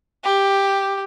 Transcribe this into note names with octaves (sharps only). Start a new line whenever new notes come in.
G4